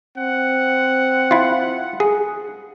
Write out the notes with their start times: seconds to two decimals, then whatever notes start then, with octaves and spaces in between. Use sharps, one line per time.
0.18 C4 F#5
1.31 E4 F4
2.00 G#4